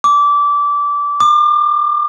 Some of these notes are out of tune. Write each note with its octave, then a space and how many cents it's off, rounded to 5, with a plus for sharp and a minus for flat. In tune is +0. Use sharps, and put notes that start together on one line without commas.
D6 -20
D6 +40